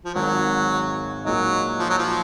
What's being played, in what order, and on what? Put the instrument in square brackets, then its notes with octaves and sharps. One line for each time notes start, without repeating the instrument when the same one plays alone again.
[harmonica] F3
[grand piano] G#1 G#2 D#3 [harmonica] F#3
[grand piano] A#2 G#3 D#4 [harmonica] F#3
[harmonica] F3
F#3
F3